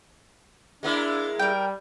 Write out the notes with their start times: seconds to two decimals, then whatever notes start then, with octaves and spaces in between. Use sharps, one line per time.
0.83 G#3 A#3 D4 E4
1.39 G3 A#4 G5